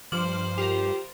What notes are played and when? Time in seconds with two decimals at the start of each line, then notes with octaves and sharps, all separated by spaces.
0.12 G2 F3 C5 D6 F#7
0.58 F4 G4 A#4